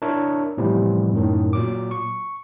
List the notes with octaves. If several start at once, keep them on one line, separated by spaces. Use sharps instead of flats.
D4 E4 A#4 C#5 E5
A2 C3 E3 F3 G3 B3
F#2 A2 D#3
A#2 F#3 D6
C#6